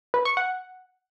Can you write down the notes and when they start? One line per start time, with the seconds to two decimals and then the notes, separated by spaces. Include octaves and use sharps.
0.14 B4
0.25 C#6
0.37 F#5